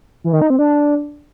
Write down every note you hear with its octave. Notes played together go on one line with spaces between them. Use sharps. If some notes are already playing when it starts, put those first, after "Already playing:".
E3
D#3
D#4
C4
D4